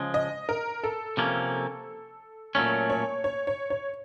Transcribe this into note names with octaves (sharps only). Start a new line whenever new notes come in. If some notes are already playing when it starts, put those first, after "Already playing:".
Already playing: C#3 F3 G#3
D#5
A#4
A4
C3 F3 A#3 C#4
A#2 F#3 A3 C#4 C#5
C#5
C#5
C#5
C#5